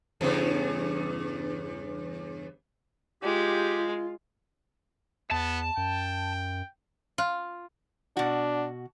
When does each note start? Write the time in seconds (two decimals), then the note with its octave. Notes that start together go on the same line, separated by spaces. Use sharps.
0.21 E2 G2 C#3
3.23 G#3 F4 G4
5.31 E2 B3 A5
5.77 F#2 G5
7.18 F4
8.17 B2 D4 F#4